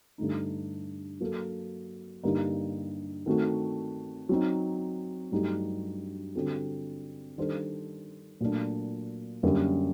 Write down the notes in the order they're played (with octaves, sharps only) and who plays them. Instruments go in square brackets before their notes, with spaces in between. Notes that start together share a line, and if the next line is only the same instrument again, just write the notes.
[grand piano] G2 D3 A3 D#4
F#3 A#3 F#4 A4
G2 D3 G3 A#3 D#4
D#3 A3 C4 F#4
F#3 C4 D#4
G2 F#3 A3 D#4 G4
D3 G3 C4 F#4 A4
D#3 G3 D4 A4 C5
A#2 F#3 A3 D4
F#2 D3 G3 A#3